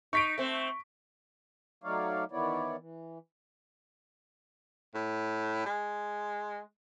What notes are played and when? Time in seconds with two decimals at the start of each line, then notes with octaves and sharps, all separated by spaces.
0.13 D#4 C#6 B6 D7
0.38 A3 C4
1.84 F#3 A3 D#4 C#5 D5 F5
2.32 D#3 E3 B3 E4 C#5 D5
2.79 E3
4.95 A2
5.65 G#3